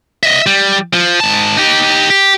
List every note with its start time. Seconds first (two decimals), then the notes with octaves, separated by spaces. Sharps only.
0.23 D#5 E5
0.46 G3
0.93 F3
1.20 G#2 A5
1.57 D#4 G4
2.10 G4